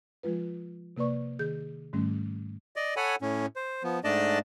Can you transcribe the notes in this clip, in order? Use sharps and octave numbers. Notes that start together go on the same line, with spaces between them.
F3 G#3 F4 B4
C3 A#3 B4 D5 C#6
D#3 G#4 G6
G#2 D#3 G3 A3 C#4
D5 D#5
A4 C#5 F#5 G#5 B5
A2 C#4
C5
F3 B3
G#2 A3 D4 D5 D#5 A5